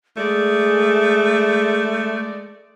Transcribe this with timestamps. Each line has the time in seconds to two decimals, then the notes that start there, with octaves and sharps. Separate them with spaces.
0.17 G#3 A3 G#4 D5